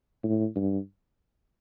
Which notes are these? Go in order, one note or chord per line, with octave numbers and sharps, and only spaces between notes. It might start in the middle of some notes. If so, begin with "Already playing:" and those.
A2
G2